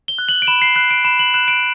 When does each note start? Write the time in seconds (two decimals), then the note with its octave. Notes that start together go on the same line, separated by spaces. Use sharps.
0.08 G7
0.18 F#6
0.29 F#7
0.42 D7
0.47 B5 E7
0.62 C7
0.76 F#6 C7
0.91 D7
1.05 B5 E7
1.19 F#7
1.34 F#6 E7
1.48 D7